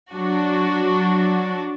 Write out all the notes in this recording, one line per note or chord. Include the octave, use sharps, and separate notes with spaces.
F#3 D4 F#4